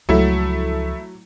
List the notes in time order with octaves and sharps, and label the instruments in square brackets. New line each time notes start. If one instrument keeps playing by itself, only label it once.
[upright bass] C#2 F3 [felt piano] F#3 [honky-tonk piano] A3 E4